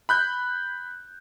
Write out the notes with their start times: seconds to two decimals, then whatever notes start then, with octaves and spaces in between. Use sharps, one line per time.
0.09 B5 F#6 G6